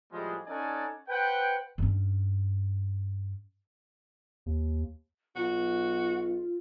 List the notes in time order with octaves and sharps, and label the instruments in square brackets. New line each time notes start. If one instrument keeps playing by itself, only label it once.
[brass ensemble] A2 F3 G3 G#3
C#4 D#4 A4 D5 F#5 G#5
B4 C5 F#5 G5
[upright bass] G2 C#4
[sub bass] D#2
[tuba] B1 [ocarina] F4 [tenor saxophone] F#4